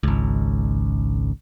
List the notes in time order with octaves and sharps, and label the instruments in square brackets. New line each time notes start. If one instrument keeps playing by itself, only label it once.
[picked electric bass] G#1 C#2